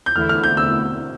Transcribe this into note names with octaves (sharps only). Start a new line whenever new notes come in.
G6
E2 D3 A3 E4 F6
F6
G6
E6